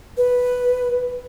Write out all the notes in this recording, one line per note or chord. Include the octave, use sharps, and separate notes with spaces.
B4